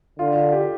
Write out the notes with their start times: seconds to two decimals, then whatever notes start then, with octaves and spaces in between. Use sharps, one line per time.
0.19 D3 F4
0.36 F4
0.52 G4